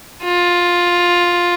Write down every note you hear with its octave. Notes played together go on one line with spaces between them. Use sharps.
F4